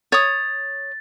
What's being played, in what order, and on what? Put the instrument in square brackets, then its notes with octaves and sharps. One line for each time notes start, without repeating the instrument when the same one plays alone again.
[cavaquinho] C#5 D#6 [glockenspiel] A6